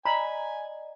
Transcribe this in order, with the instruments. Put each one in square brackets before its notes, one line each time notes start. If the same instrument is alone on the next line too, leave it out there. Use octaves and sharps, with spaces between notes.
[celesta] D5 D#5 [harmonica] G#5 [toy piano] A#5 [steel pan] B5